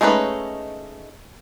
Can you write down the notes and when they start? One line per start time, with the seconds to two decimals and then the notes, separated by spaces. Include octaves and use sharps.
0.01 G#3 A3 C#4 D#4 B4